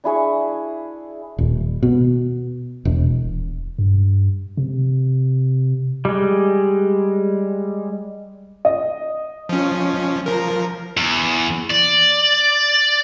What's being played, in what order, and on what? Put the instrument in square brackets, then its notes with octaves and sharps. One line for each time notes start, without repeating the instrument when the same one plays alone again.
[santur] D4 E4 G#4 C#6
[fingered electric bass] D#1
B2
E1
[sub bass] D#1
G2
C3
[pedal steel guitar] G3 G#3
[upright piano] D#5
[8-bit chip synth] F3 C#4
F3 A#4
[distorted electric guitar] E2
D5